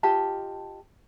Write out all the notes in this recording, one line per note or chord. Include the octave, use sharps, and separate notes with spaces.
F4 G4 D#5 A5